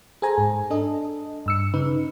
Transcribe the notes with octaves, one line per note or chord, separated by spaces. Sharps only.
G#4 A4 C5 G#5 A#5
G#2
D4 A4 D#5
G2 E6 C#7
C#3 D#4 B4